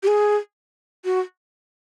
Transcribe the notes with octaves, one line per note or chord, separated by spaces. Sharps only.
G4
G#4
F#4